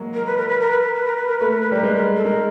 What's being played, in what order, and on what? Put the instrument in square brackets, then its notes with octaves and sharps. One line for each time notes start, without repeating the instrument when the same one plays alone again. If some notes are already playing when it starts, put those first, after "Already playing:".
Already playing: [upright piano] F#3 G#3 A#3
[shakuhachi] A#4
B4
A#4
B4
A#4
B4
A#4
B4
A#4
B4
A#4
[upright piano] A3 [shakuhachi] B4
[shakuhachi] A#4
B4
[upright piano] G3 [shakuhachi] A#4
[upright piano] G#3 [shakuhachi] B4
[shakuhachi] A#4
A4
[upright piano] G#3 [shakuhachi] A#4